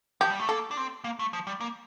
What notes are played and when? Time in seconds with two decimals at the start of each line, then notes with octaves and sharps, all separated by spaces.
0.21 F3 G4
0.30 G3
0.39 A3
0.48 A#3 A4
0.71 D4
0.77 C4
1.04 A#3
1.19 A3
1.33 F3
1.47 G3
1.61 A#3